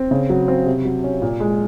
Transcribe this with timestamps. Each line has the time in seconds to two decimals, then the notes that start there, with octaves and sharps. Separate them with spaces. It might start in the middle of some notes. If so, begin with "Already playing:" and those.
Already playing: C4
0.11 C#3
0.29 F#3
0.48 C4
0.66 C3
0.85 F#3
1.04 C#4
1.22 A#2
1.40 G#3